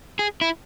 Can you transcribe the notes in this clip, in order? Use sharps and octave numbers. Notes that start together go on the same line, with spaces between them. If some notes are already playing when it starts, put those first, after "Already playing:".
G#4
E4